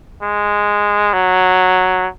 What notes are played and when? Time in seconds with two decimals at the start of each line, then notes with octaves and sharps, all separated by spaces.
0.23 G#3
1.13 F#3